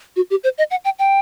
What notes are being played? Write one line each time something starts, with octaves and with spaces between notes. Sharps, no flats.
F#4
G4
C5
D#5
F#5
G5
G5